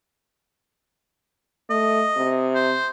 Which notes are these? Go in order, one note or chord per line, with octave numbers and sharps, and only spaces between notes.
A3 D#5
C3
C5